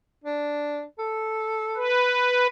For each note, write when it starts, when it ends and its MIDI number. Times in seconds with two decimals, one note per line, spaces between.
0.24 0.83 62
0.98 1.91 69
1.76 2.47 71